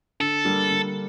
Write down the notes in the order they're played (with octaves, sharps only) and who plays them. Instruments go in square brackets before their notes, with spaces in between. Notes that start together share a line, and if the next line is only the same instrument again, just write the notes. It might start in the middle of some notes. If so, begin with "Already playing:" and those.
[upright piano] D3 [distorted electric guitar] A4
[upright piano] G3 A#3 D4
D3